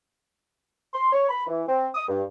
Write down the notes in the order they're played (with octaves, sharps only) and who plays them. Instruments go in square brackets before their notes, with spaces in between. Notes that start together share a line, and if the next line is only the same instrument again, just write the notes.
[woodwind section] C6
C#5
B5
E3
C4
D#6
G2